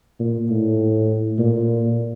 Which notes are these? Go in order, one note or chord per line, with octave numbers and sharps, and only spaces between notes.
A#2
A2
A#2